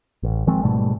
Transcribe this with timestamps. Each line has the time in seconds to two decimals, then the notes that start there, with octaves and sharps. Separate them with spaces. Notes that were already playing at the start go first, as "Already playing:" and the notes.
0.23 A1
0.47 D#3 F3 G#3 C4
0.63 G#2 B2 G3 A3